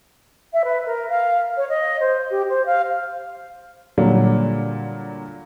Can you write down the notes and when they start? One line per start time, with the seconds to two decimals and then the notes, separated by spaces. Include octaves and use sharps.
0.53 E5
0.64 B4
0.85 A#4
1.09 F5
1.57 C#5
1.69 D#5
2.00 C5
2.30 G4
2.49 C5
2.66 F5
3.98 A#2 D3 F#3 G3 A#3